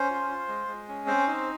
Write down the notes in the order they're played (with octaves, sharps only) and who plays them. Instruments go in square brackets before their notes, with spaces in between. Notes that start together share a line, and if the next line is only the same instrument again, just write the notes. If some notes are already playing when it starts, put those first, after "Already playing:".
Already playing: [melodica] C#4 C5
F4
F4
G#3
G#3
C#4
C4 C5
D#4